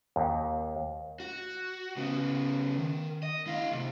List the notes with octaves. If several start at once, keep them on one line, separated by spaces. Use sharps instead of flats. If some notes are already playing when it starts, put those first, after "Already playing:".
D#2
F#4
C#3 B3
D#3
D#5
E4 F5
D2 C3